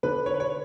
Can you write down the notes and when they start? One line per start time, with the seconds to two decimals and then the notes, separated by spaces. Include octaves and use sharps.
0.03 D3 B4
0.26 C#5
0.34 B4
0.40 C#5